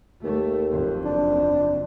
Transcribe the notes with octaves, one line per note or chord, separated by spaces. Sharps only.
D#2 A3
F#1 F2
D4